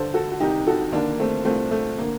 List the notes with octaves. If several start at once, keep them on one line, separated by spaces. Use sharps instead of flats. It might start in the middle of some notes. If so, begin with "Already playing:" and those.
Already playing: G2 D3 A4 C5
F#4 A4
F#4
C2 C3 D#3 D#4 G4
F#4 A4
D#2 D3 A#3 D4
A#3
A3 C4
C2 A#2 A3 C4
A3
D3 A#3